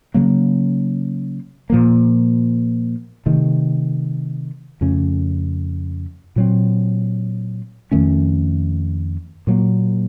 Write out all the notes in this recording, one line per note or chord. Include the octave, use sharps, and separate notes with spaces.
C#3 F#3 A#3
A#2 F3 A#3
C3 D#3 A3
F2 C#3 A3 C#4
A#2 F#3 C4
F2 D#3 A3 C#4
A#2 F#3 A#3